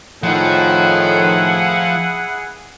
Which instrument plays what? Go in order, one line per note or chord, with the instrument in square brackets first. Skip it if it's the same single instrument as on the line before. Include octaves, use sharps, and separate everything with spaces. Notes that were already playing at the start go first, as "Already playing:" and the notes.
[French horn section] A2 D#3 [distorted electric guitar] F3 [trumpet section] E4 G#4 F#5